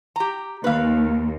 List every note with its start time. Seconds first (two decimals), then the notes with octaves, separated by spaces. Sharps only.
0.16 G4 A#5
0.64 D#2 B4 F5